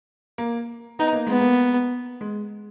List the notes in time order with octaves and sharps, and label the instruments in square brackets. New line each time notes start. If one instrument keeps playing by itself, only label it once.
[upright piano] A#3
[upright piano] B3 [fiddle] D#4
[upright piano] A#3
[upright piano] G#3 [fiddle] B3
[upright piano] A#3
G#3